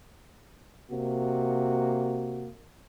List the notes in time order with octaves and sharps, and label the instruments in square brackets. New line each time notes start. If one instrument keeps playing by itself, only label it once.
[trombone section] C3 A#3 F#4